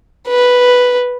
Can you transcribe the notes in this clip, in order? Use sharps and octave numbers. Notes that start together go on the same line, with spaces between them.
B4